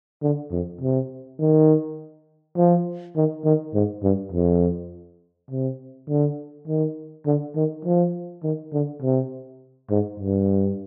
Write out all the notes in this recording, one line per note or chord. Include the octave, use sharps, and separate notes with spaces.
D3
F2
C3
D#3
F3
D#3
D#3
G#2
G2
F2
C3
D3
D#3
D3
D#3
F3
D#3
D3
C3
G#2
G2